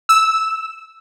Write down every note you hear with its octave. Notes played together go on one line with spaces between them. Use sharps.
E6